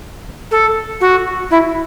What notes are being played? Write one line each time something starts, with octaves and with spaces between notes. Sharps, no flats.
A4
F#4
E4